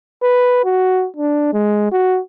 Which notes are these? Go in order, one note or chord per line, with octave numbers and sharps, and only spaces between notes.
B4
F#4
D4
G#3
F#4